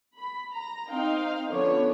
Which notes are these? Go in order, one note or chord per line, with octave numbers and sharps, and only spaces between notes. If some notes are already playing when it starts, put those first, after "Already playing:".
B5
A#5
C4 D#4 F5 G5
D3 F3 B3 C#4 C#5 D5